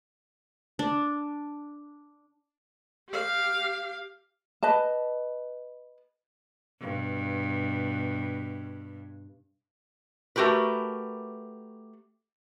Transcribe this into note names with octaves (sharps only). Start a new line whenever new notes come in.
D4
G4 F5
B4 D#5 A5
G2 B2
A3 F#4 G4 A#4 B4